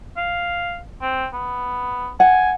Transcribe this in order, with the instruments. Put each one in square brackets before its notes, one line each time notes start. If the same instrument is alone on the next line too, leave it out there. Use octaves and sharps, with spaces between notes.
[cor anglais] F5
C4
B3
[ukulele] F#5 [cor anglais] G#5